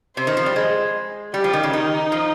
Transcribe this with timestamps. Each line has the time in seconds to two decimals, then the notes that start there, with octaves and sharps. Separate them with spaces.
0.17 C3 C5
0.27 D#3
0.37 F3
0.46 G3
0.56 G#3
1.34 G3 G4
1.44 F3
1.53 D#3
1.63 C#3
1.73 D#3 D#4
2.12 F3